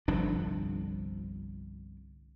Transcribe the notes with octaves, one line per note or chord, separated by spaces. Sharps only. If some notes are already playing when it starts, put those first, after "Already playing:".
G1 C2 F3 D4